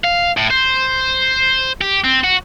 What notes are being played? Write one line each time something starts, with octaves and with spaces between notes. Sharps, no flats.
F5
A2
C5
G4
C4
F#4